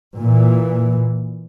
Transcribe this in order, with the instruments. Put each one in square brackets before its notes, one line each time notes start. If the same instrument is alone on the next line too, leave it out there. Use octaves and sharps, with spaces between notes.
[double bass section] A#2 E3